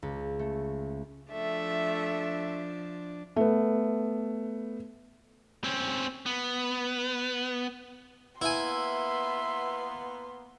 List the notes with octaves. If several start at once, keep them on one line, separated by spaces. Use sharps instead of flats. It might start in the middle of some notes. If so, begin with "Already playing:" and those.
C#2
A3
F3 A3 D4 E5
A3 B3
C4 C#4
B3
A#3 B3 E4 E5 G#5 C6